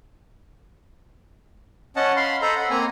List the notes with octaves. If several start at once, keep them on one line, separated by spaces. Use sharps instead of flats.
C#4 D#5 F#5 A5
F5 B5 C6
A4 C5 D#5 A#5 B5
F#5 B5
A#3 C4 G#5 A#5